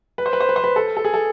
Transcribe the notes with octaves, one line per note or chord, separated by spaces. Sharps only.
B4
C5
B4
C5
B4
C5
B4
A4
A4
G#4
A4